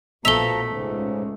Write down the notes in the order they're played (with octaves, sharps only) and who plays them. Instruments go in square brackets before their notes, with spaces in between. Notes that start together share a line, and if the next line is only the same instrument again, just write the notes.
[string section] A#1 B2 [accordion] F3 A#5 [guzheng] A3 E5 [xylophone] F7 G7
[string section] C#2 [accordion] G#2